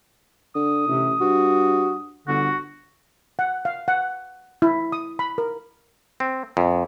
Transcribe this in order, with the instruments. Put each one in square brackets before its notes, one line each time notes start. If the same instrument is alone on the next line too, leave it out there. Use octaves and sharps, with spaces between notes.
[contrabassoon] D3 [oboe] D#6
[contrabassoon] A1 [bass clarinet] C3
[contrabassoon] G2 [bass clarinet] F#4
[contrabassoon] G1 [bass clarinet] D3 [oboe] F#4
[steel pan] F#5
F5
F#5
E4
D#6
B5
A#4
[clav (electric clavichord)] C4
F2